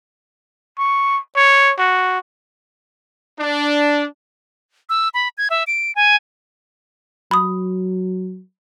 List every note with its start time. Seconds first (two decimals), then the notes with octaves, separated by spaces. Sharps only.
0.79 C#6
1.36 C#5
1.79 F#4
3.40 D4
4.89 E6
5.14 B5
5.38 G#6
5.50 E5
5.67 D7
5.95 G#5
7.31 F#3 B5 D#6